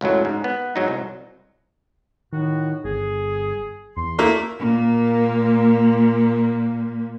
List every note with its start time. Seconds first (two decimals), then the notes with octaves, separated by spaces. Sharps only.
0.01 C#2 F#2 A2 F#3
0.25 G#2
0.44 B3
0.76 G#2 F#3 D#4
0.88 C2
2.33 A2 D#3 F#4
2.84 G1 G#4
3.97 E2 C6
4.18 A3 A#3 E4
4.59 A#2 A#3